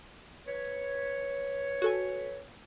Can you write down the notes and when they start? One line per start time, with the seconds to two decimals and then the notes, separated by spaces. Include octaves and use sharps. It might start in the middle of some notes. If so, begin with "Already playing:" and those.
0.47 B4 C#5
1.82 F#4 A4 G#5